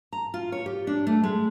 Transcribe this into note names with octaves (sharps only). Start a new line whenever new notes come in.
A#5
F4
C#5
G4
D4
A3
G#3